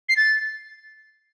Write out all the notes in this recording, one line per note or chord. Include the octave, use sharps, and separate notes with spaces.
C7
A6